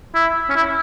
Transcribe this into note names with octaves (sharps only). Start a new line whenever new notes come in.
E4
C#4
E4